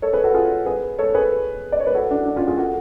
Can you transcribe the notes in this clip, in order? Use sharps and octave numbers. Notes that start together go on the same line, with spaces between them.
A4 C#5
G#4 B4
F#4 A4
F4 G#4
G#4 B4
A4 C#5
G#4 B4
D5
C#5
B4
F#4 A4
D4 F#4
D4
C#4 F4
F4 G#4
F#4 A4